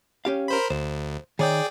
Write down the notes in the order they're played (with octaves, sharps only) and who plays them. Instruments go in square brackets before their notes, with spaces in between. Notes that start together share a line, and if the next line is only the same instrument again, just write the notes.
[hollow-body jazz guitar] C#4 G4 F5
[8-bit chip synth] A#4 C5 B5
[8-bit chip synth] D2 [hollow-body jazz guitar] C5
[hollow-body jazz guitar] D#3 C#5 [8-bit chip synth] G#4 D5 G5